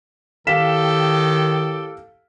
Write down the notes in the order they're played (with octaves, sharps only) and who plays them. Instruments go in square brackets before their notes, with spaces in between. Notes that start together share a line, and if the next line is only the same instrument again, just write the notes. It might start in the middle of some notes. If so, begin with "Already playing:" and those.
[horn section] A2 G4 A4 [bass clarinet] D#3 [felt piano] F5 B6 E7